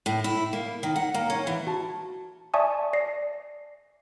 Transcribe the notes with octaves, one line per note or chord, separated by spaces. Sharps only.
A2
E4
A#3
D#3
F#5
A#3
C#4
E3
F#4 A5
D5 E5 G#5 A5 C#6 D#6
D5 A#6 C7